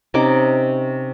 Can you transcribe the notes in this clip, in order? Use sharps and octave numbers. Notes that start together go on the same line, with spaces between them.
C3 C#4 D#4 D6